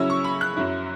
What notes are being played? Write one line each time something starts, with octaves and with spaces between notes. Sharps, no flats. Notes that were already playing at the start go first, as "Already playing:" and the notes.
Already playing: C#3 F#3 C#4 E4 E6
C#6
B5
F#6
F#2 F#3 E4